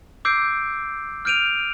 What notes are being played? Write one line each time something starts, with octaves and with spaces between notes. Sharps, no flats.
D6 E6 G6 C7 D7
F6 G6 D7 D#7 F7